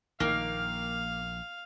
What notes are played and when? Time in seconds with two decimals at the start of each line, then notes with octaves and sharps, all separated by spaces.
0.20 A#1 D#3 A#3 F5